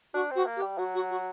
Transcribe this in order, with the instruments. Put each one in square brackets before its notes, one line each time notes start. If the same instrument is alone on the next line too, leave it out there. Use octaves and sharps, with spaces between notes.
[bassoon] D4 [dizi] F#4
[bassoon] C4 [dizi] F#4
[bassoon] A#3
[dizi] G4
[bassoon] G3
[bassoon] F#3 [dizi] F#4
[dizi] F#4
F#4